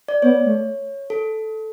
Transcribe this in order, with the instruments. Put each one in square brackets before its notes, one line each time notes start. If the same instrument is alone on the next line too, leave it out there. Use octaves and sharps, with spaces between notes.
[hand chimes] D5
[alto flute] B3 [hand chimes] C#5
[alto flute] A3
[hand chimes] A4